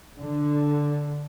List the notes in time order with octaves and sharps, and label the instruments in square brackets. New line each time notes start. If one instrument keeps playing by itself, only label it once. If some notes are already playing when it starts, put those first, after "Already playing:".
[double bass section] D3